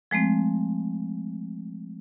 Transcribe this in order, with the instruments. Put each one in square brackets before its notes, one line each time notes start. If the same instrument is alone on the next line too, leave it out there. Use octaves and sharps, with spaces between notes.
[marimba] F3 G#3 A3 C4